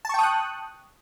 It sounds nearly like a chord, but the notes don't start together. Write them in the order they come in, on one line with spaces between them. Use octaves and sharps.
A5 C#6 G5 D#6 F#6